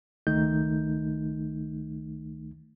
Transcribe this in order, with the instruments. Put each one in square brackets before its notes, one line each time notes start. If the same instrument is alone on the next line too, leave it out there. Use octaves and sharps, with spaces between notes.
[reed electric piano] C#2 D#3 A3 D#4 G6